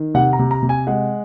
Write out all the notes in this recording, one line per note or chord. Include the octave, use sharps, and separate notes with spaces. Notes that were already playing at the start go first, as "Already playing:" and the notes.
Already playing: D#3
C3 F#5
A#5
C3
A#5
C3
G#5
G#3 F#5